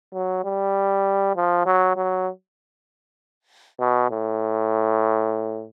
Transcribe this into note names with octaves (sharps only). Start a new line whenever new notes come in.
F#3
G3
F3
F#3
F#3
B2
A2